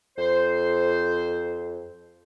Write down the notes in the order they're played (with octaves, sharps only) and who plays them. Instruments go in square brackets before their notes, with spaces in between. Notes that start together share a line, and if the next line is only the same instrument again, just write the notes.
[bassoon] F2 [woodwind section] C5